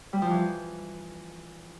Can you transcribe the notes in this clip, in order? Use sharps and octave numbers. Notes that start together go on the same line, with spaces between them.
G3
F3
E3